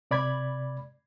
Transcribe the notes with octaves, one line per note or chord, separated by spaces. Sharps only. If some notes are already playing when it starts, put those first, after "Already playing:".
C3 D5 B5 G#6